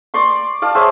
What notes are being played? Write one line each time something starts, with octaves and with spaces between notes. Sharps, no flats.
D5 C6 C#6
D5 F5 A5
G#4 C5 C#5 E5